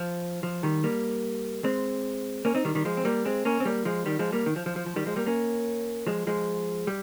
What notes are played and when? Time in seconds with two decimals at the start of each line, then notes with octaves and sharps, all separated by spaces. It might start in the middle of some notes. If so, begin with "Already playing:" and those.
Already playing: F3
0.43 F3
0.63 D#3 G3
0.83 G3 A#3
1.64 G#3 C4
2.45 A#3 C#4
2.55 C4 D#4
2.65 D#3 G3
2.75 D#3 G3
2.85 F3 G#3
2.97 C4
3.05 G3 A#3
3.25 G#3 C4
3.45 A#3 C#4
3.60 C4
3.65 G3 A#3
3.85 F3 G#3
4.06 D#3 G3
4.19 F3 G#3
4.32 G3 A#3
4.46 D#3
4.56 F3
4.66 F3
4.76 F3
4.86 F3
4.96 D#3 G3
5.06 F3 G#3
5.16 G3 A#3
5.26 A#3 C#4
6.07 F3 G#3
6.27 F3 G#3
6.87 G3